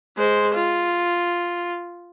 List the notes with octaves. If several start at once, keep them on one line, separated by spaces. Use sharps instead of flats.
G#3 C5
F4